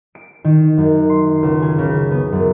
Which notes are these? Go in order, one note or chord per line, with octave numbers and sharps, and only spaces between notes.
D7
D#3
F#2
C6
C#2
G#4
C#3
B3
F#2